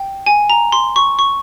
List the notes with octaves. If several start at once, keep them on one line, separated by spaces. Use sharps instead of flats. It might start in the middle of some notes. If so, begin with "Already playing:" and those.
Already playing: G5
G#5
A#5
C6
C#6
C#6